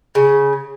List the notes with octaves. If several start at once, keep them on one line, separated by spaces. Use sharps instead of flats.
C#3